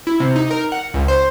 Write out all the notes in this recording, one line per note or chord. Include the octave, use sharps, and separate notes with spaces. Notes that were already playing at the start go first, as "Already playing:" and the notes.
E4
C3
D#4
A#4
F#5
C#2
C5